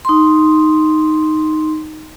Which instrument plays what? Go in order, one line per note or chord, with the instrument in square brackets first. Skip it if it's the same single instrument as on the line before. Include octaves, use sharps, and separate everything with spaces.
[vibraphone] D#4 C6